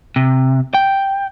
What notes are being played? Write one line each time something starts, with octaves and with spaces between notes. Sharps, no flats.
C3
G5